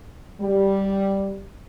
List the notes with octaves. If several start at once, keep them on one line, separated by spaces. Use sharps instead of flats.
G3